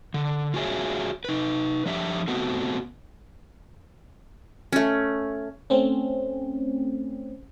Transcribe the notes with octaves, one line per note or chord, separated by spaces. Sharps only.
D3
F4 F#4 G#4 A4 C#5 E5
D#4 B4
F3 D4 G4 E5
A3 B3 C4 F#4
A3 C#4
A3 C4 C#4